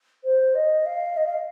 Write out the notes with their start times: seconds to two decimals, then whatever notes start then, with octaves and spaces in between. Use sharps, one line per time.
0.24 C5
0.55 D#5
0.86 F5
1.17 D#5
1.26 F5